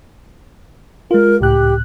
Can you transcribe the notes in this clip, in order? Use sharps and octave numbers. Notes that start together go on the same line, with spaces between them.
G#3 F4 A#4
C#2 A2 G4 F#6